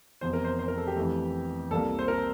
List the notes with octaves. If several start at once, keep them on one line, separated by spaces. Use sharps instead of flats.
F1 E2 C3 C5
A#4
C5
C5
A#4
A4
G4
F2 E3 A3
C2 C3 G3 A#3 A4
C5
A#4